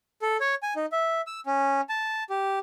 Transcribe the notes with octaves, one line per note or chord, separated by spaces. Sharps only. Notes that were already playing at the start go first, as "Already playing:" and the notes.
A4
C#5
G#5
D#4
E5
E6
C#4
A5
G4